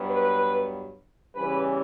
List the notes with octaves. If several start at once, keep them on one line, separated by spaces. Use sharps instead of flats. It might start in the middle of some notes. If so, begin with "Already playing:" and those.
Already playing: G2 F#3 B3
B4
E2 C#3 E3 G3 C#4 B4